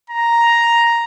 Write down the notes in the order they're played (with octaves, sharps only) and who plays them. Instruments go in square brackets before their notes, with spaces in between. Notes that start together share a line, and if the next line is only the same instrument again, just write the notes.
[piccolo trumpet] A#5